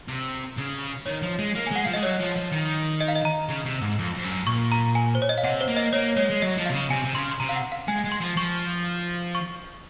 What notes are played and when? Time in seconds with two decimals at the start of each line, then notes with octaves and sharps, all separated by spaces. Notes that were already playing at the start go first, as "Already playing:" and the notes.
0.08 C3
0.57 C#3
1.06 D#3 C#5
1.22 F3
1.39 G#3
1.55 A#3
1.67 G#5
1.71 G#3 F#5
1.85 F3 F5
1.93 G#3 D#5
2.03 F#3 C#5
2.20 F3
2.36 F3
2.52 D#3
3.00 D#5
3.08 F5
3.16 D#5
3.25 A#5
3.49 C#3
3.65 C3
3.82 G#2
3.99 F2
4.15 F2
4.23 F#2
4.46 A#2 C#6
4.72 A#5
4.95 G#5
5.15 C5
5.22 C#5
5.29 D#5
5.38 F5
5.44 C3 F#5
5.61 C5
5.68 A#3
5.77 D#5
5.93 A#3 C#5
6.17 G#3 C#5
6.30 G#3
6.42 F#3 D#5
6.57 F3
6.66 F5
6.69 C3
6.74 C#3
6.90 C3 G#5
7.04 C3
7.14 C#3 C6
7.31 C6
7.40 C3 A#5
7.49 F5
7.56 F#5
7.72 F5
7.88 G#3 G#5
8.05 G#3
8.12 C6
8.21 F3
8.36 F3 C#6
9.35 C#6